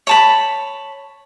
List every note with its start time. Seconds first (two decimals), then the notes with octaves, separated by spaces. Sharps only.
0.07 C#5 A5 B5